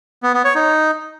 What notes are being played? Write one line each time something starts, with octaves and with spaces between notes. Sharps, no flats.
B3
B3
C#5
D#4